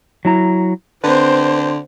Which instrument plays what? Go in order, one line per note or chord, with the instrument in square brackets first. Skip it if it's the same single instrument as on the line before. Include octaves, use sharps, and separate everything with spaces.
[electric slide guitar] F#3 E4 A#5
[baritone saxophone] D3 [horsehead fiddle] C4 C5 [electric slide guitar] B4